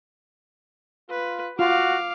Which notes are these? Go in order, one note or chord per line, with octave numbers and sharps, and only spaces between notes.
F4 B4
F4 F#4 F5 D6